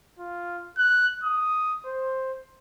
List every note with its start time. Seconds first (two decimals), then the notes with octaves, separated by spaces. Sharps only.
0.19 F4
0.78 F#6
1.24 D#6
1.86 C5